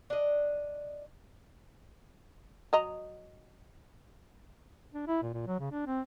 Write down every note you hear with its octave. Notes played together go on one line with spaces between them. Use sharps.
D4 D#5
F#3 D#5 A#5
D4
E4
A#2
A#2
F#3
C#3
D4
C4